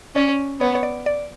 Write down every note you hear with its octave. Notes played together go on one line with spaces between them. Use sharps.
C#4 D5
B3 C#5
C#5
D5
D5